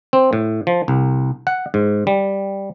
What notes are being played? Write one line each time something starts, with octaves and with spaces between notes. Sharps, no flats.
C4
A2
F3
C2
F#5
G#2
G3